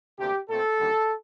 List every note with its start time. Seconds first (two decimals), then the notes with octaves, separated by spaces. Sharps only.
0.18 D2 C3 G3 A#3 G4
0.49 A#2 A3 C4 A4
0.79 D#2 D3 G3 A#3